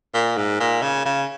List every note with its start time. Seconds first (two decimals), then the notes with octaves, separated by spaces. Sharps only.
0.14 A#2
0.37 G#2
0.60 A#2
0.82 C#3
1.05 C#3